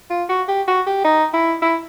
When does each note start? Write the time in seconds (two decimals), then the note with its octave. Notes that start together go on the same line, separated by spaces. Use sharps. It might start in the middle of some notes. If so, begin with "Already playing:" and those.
0.10 F4
0.29 F#4
0.48 G4
0.67 F#4
0.86 G4
1.05 D#4
1.34 E4
1.62 E4